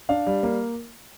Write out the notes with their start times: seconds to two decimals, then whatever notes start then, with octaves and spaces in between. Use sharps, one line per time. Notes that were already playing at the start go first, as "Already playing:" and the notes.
0.09 D4 F5
0.27 G3
0.43 A#3